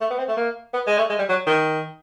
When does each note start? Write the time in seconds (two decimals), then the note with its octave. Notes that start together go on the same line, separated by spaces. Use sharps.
0.01 A3
0.10 B3
0.18 C4
0.28 A3
0.37 A#3
0.73 B3
0.87 G#3
0.98 A3
1.10 G#3
1.19 G3
1.29 F#3
1.47 D#3